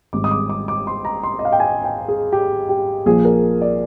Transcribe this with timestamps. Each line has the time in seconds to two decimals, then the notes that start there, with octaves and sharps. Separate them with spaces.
0.13 G#1 G#2 G3 D6
0.24 D#6
0.31 D6
0.50 D6
0.68 D6
0.87 C6
1.05 A#5
1.23 C6
1.39 D#5
1.45 F5
1.52 G5
1.60 G#5
1.84 G5
2.08 G#4
2.32 G4
2.69 G4
3.06 A#1 A#2 F3 G#4
3.25 A#4
3.61 D5